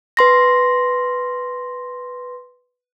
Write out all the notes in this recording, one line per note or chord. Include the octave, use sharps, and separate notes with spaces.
B4 C6 A#6